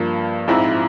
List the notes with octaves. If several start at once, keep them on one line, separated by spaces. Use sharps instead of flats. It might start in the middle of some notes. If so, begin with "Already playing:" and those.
Already playing: G2 F3 A#3
A#1 G#2 F3 C4 E4